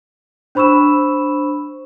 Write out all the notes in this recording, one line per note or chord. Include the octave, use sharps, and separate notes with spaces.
D4 C5 B5 C#6 E6 E7